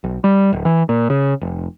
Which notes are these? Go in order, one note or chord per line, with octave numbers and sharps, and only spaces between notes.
B1
G3
D1
E3
A#2
C#3
F1